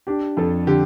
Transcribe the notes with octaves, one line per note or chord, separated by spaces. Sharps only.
D4 G4
F2 A4
D3 G4